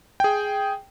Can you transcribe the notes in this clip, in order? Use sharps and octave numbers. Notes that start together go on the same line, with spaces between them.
G#4 G5